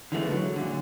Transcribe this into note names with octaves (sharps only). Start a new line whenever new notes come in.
D3 E3 F3 G#3 A3 B3
F#3
A#2 D3